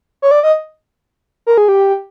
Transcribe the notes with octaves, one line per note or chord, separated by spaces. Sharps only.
C#5
D5
D#5
A#4
G#4
G4